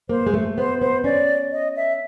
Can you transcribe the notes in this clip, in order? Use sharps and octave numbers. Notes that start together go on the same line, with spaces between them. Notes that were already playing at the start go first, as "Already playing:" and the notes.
A#3 C5
G#3
A3
B3 C5
B3 C5
C#4 D5
D#5
E5